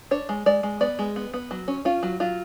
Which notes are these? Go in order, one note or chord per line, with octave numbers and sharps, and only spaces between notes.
D4 C#5
G#3
G#3 D5
G#3
B3 D5
G#3
B3
B3
F#3
C#4
C#4 F4
F#3
F#3 F4